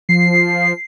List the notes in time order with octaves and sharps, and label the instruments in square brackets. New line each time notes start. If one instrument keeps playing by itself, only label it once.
[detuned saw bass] F3 [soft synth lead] C7